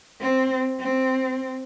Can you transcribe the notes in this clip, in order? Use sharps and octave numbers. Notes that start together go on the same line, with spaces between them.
C4
C4